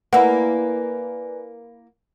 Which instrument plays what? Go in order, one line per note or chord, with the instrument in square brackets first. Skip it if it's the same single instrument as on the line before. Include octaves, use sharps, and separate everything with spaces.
[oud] A#3 E4 [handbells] B4 D5 G#5 [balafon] F#5